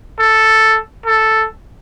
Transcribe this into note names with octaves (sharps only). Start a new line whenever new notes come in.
A4
A4